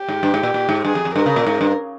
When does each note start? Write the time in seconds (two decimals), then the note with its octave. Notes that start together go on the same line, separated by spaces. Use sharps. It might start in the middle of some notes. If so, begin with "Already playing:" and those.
Already playing: G4
0.09 G#2
0.23 G2
0.34 G#2
0.43 A#2
0.54 A#2
0.69 G#2
0.85 G2 G#4
0.95 F2
1.05 F2
1.15 G2 A#4
1.26 C#3
1.36 A#2
1.47 G#2
1.61 G2